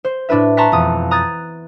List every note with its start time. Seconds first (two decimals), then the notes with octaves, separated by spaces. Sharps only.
0.04 C5
0.29 A2 D4 E4 B4 E5
0.57 A5 A#5 C6 C#6 F#6 B6
0.72 E1 F2 D#6
1.11 A#5 D#6 F#6 G#6 A6